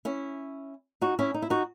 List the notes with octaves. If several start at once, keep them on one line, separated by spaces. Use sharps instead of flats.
C#4 E4
D#4 F#4
C#4 E4
D#4
E4
D#4 F#4